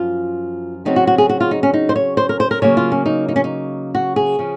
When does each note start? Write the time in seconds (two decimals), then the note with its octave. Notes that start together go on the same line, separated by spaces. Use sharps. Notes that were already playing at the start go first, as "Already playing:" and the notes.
Already playing: F#2 F3 F4
0.85 C#3 F#3 C4 D#4
0.96 F#4
1.07 F#4
1.18 G#4
1.29 F#4
1.40 F4
1.51 D#4
1.63 C#4
1.74 D#4
1.89 C5
1.96 C#5
2.17 C5
2.29 A#4
2.40 C5
2.51 A#4
2.62 C#3 F#3 A#3 C#5
2.77 F4
2.92 C#4
3.06 D#4
3.28 D#4
3.36 C#4
3.44 D#4
3.95 F#4
4.16 G#4
4.39 C#3 F3